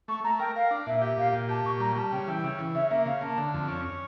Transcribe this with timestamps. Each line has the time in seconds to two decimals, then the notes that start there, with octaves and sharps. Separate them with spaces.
0.08 A3 C#6
0.24 A3 A#5
0.39 A#4 G5
0.55 A#4 F5
0.71 D4
0.86 A#2 E5
1.02 G4
1.17 A#2 F5
1.33 A#2
1.49 G4 A5
1.65 A#2 C#6
1.80 G3 A#5
1.96 G3 A5
2.12 C#3 G5
2.27 E3 G5
2.44 C#3
2.59 E3
2.74 C#3 E5
2.90 A#3 E5
3.06 C#3 F5
3.21 A#3 A5
3.37 D3
3.54 F2
3.68 C#4
3.85 C#4